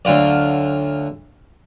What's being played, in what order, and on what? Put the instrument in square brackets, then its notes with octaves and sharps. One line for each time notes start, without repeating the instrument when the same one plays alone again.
[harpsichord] D2 F#3 F4 D5